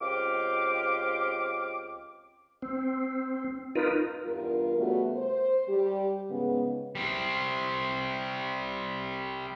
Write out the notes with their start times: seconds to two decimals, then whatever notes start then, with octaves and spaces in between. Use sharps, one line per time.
0.01 C#2 C4 G4 F5 D6
2.62 C4
3.75 D#4 F4 A#4 B4
4.25 E2 G2 F4 A#4
4.77 C#3 G3 A3 B3 F#4
5.16 C5
5.68 G3 G4
6.30 G#2 C#3 B3
6.95 G3 C4